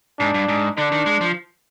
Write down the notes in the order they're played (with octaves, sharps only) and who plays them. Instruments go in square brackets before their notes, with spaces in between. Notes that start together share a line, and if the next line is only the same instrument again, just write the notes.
[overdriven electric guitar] G#2 [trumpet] D4
[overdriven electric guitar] G2
G#2
[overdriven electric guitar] D3 [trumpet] D4
[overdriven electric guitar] D#3
G#3
F3